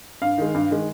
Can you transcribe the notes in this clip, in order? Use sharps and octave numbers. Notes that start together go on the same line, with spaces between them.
G2 F5
D#3 G#3
G2
D#3 G#3